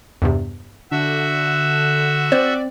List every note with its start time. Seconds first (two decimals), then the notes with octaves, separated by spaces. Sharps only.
0.22 E2 G2 C3
0.91 D3 F#4 E5
2.32 C4 C5 D5